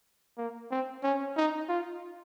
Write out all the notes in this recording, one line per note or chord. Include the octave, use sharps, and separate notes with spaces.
A#3
C4
C#4
D#4
F4